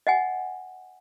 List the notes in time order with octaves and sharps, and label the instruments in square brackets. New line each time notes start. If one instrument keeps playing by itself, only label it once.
[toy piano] D#5 F#5 G#5